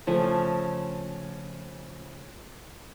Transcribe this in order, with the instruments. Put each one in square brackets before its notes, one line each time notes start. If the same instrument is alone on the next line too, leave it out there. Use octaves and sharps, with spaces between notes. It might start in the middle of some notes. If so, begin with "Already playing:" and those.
[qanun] C#3 F3 A3 G#5